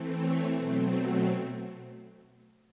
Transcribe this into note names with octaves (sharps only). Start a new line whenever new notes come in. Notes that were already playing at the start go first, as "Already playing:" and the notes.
Already playing: E3 A3 C4
C#5
B2 F#3 A3 C4